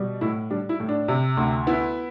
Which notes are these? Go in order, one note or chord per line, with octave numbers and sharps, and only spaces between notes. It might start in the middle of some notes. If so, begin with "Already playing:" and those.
Already playing: B2 G3
A2 E4
G3 D4
E4
A2
D4
C3
D2
B3 E4